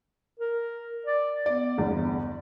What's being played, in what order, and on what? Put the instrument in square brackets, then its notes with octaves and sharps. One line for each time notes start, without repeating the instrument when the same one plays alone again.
[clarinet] A#4
D5
[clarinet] B3 [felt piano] D5
[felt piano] G1 E2